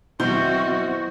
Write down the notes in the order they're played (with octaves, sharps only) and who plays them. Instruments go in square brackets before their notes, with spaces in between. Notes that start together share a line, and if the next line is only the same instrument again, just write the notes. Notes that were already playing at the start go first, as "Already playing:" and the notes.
[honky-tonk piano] B2 [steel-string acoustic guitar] F#3 E4 [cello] C4 F#4 [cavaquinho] C5